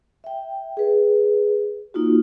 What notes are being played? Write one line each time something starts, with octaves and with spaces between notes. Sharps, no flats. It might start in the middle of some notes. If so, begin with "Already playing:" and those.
E5 G5
G#4 B4
A#3 D#4 F4 F#4